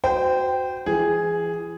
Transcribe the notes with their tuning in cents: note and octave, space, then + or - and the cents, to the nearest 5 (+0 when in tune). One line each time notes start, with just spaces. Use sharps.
F#4 +0 C5 -30 G5 +0
E3 +40 G#4 +0